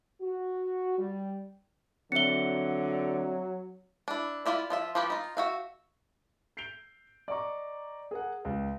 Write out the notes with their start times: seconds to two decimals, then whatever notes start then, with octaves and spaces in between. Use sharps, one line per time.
0.21 F#4
0.99 G3
2.12 D3 F#3 C4 E5 C#7 G7
4.08 D4 E4
4.46 E4 F4 D5 E5
4.70 F3 F4 E5
4.95 F3 F4 G4 B4 C5
5.10 D#4 F4
5.37 F#4 E5 F5
6.57 G6 C7 D7 F7 G7
7.28 D5 D#5 A#5 C#6 D6
8.11 G#4 A#4 F#5
8.45 C#2